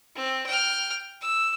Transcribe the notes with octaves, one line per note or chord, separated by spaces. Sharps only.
C4
G5 F6
E6